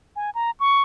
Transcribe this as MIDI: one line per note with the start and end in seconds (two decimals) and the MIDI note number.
0.16 0.30 80
0.35 0.51 82
0.60 0.83 85